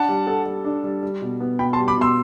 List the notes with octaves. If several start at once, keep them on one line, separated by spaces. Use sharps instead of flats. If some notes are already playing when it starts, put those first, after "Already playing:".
Already playing: D4 F#5 A5
G3
A4
G3
D4
G3
G3
B2
B3
B2 G5 B5
A5 C6
G3
B5 D6
B2 C6 E6